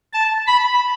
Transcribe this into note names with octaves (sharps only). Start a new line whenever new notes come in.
A5
B5